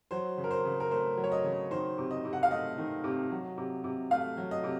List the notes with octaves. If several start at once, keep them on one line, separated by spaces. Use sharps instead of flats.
F#3 C5
C#3
A#4
C5
C#3
A#4
A3 C5
F#3
C#5
D#5
C#3
D#3 C5
C3
D#5
C3
F#5
F5
A3 D#5
D#3
C3
F#3
C3
C3
A3 F5
F#3
D#5
C3